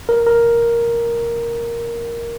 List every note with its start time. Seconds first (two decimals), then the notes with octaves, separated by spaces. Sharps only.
0.09 A#4
0.27 A#4